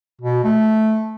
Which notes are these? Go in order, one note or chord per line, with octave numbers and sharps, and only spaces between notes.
B2
A3